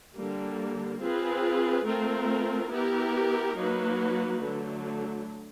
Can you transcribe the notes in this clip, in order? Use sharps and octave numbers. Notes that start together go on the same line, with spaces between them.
D3 G3 A#3
C4 F4 G#4 B4
A3 C4 F4 A#4
B3 E4 G4 A#4
F#3 A#3 D#4 F#4 B4
D3 F#3 A3